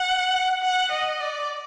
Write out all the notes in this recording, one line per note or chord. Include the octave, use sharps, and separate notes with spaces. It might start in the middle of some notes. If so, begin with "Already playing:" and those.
Already playing: F#5
F#5
D#5
D5